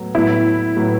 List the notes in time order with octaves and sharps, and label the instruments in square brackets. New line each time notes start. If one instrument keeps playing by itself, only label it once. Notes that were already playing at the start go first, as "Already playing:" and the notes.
Already playing: [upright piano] A2 F#3 B3
[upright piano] A2 F#3 B3 [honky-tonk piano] E4
[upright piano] A2 F#3 B3